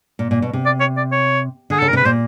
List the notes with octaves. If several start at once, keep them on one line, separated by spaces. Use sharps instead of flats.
A#2
A#2
B2
C3
D5
C#5
D5
C#5
D3 G#4
C#3 A4
A#4
C3 B4
A#2 C5